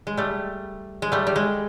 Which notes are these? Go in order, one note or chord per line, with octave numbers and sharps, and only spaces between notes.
G#3
G3 A3
G#3
G3 A3
G3
G#3